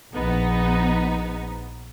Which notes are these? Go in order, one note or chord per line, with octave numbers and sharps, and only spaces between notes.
A#1 B3 D#4